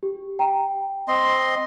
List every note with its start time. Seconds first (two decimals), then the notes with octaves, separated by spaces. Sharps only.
0.03 G4
0.39 G5 A#5
1.08 C4 D#5 C6